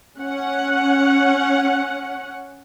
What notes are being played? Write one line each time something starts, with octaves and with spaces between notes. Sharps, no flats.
C#4 F#5